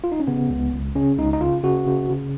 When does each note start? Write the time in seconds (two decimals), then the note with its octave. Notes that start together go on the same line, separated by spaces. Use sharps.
0.04 F4
0.12 D#4
0.20 C#4
0.27 C#3 B3
0.50 C#2
0.73 C#2
0.95 C#3 C#4
1.18 C#2 D#4
1.33 D#4
1.41 C#3 F4
1.64 C#3 F#4
1.86 C#3
2.09 C#3